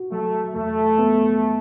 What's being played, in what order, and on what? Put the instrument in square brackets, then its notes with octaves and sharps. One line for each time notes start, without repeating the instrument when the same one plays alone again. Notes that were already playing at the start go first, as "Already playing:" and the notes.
Already playing: [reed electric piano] F#4
[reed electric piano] F#3 [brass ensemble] A3
[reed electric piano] E2 [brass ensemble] A3
[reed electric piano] B3